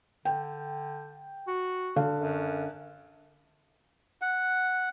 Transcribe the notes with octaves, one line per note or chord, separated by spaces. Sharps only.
D3 G5
F#4
D3 F5
F#2
F#5